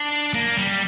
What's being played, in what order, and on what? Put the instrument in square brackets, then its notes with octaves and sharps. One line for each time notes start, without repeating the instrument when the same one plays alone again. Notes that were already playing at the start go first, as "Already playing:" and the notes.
Already playing: [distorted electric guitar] D4
A#3
G3